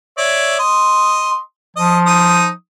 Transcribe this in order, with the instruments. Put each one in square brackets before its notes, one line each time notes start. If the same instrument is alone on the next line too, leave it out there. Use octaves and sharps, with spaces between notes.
[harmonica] C#5 D5 E5
D#5 C6
[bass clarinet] F3 [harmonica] D#5
[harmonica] D#4 D#6